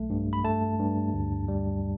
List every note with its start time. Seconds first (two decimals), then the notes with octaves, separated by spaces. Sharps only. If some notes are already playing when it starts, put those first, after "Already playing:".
Already playing: B1 A3
0.10 G2
0.33 B5
0.44 A3 A5
0.79 G2
1.13 D2
1.48 G3